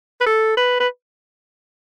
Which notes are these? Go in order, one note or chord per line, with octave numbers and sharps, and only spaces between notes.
B4
A4
B4
B4